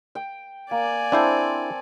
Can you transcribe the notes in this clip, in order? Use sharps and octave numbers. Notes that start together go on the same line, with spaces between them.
G5
A#3 D5 G#5
C4 D4 E4 A4 C5